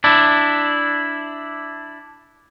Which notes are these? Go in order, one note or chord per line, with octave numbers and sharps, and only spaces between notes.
D4 E4